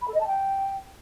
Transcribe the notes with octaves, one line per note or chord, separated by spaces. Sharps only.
B5
A4
D#5
A5
G5